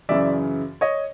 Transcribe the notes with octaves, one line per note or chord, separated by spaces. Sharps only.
F#2 C#3 E3 D5 E5
C#5 D#5